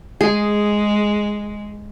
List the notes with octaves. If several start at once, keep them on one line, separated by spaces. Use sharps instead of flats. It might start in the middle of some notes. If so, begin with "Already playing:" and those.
G#3 G#4